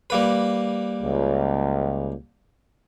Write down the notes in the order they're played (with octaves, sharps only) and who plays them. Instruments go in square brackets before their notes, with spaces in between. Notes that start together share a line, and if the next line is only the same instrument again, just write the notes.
[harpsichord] G3 A#3 B4
[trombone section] C#2